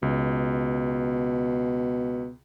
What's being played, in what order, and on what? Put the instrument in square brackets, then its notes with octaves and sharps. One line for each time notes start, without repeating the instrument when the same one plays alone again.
[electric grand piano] C#2 [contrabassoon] B2